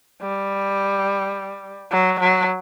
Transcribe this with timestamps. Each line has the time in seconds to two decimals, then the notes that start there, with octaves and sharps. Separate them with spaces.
0.22 G3
1.92 F#3
2.20 F#3